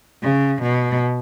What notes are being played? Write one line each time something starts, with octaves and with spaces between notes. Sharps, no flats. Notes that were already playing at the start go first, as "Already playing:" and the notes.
C#3
B2